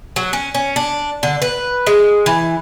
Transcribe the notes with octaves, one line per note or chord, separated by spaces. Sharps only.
F#3
C#4
C#4
D4
D3
B4
G#3
E3